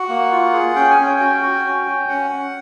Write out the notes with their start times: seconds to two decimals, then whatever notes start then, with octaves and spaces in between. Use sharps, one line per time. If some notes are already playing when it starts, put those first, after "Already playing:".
Already playing: F#4 F#5
0.09 A#3
0.31 F4
0.53 G#4
0.76 C#4 G5
0.91 G#5
0.98 C#4
1.05 G5
1.20 F#4
1.42 F#4
1.65 C#4
1.87 C#4
2.09 C#4 F#5